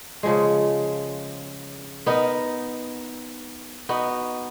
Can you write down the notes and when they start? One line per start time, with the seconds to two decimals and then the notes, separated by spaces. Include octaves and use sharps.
0.23 C#3 F3 G#3
2.06 B3 D#4 A#4
3.89 B3 D#4 F#4